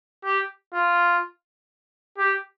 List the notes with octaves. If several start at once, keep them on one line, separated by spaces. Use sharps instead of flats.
G4
F4
G4